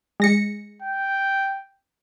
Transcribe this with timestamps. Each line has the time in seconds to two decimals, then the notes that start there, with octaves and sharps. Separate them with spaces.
0.20 G#3 A#6 C#7
0.83 G5